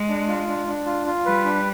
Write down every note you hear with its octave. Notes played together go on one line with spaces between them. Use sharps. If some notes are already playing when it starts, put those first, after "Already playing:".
Already playing: G#3
D4
F4
D4
D4
F4
F4
G3 B4
D4